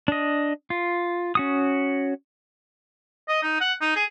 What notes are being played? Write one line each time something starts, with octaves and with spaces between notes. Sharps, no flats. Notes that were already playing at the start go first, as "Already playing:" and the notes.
D4 D#5
F4
C#4 F#4 D#6
D#5
D#4
F#5
D#4
G#4